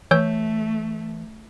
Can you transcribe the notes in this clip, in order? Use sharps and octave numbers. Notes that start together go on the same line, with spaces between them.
E3 A3 C#5 E6 G6